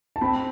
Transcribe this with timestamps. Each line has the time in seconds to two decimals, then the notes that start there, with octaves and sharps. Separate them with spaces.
0.16 A5
0.21 C4 B5